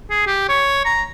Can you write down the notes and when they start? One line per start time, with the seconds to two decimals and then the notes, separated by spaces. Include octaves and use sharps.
0.10 G#4
0.26 G4
0.49 C#5
0.85 A#5